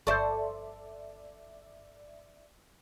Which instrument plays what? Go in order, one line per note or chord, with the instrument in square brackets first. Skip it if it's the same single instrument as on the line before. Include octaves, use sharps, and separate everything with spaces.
[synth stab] G1 D5 E5 [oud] A4 C5 [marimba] C#6 G6